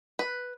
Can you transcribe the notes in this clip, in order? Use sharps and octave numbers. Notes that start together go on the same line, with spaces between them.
B4